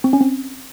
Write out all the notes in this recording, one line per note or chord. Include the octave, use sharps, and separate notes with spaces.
C4
C#4
C4